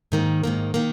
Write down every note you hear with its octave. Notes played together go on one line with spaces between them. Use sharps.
G#2 D#3 A#3
G#2 D#3 A#3
D#3 A#3